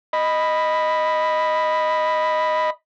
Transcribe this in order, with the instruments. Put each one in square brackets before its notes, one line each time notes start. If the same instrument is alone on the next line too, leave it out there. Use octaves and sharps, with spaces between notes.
[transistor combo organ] D#5 B5